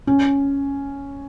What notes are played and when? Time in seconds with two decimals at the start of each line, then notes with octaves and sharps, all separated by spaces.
0.07 C#4